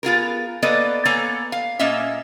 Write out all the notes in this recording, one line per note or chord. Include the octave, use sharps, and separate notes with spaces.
B3 F4 G#4 A#4
A#3 B3 A4 B4 D5 D#5
A#3 B3 A4 C#5 G#5 A#5
F5
A#2 A#3 C#4 D#5 E5